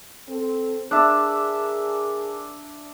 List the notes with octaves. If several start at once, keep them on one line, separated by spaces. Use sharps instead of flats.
C4 A4
D4 G#4 A#4 E5